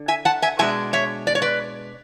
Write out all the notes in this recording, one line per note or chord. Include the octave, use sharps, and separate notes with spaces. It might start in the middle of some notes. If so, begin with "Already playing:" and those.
Already playing: D3
E5 G#5
F#5 A5
E5 G#5
B2 G#3 D4 E5 G#5
C#5 E5
D5
C#5
B4 D5